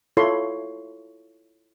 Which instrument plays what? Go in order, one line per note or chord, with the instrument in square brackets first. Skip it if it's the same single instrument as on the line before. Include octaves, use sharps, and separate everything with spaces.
[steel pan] E4 F4 A4 C#5 B5 C6